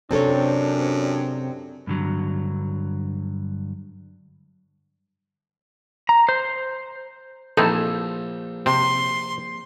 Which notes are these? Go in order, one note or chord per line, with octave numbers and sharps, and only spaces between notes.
F#2 C3 C4 D4 A4 C#5
G2 D3 F#3
A#5
C5
A#1 E3 C4 D#4 A4
C3 C4 C6